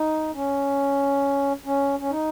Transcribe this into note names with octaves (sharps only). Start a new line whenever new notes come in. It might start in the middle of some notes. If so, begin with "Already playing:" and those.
Already playing: D#4
C#4
C#4
C#4
D#4